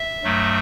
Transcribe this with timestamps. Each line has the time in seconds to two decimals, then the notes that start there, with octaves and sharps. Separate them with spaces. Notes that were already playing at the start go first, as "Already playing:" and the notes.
Already playing: E5
0.23 G2 F#3 A3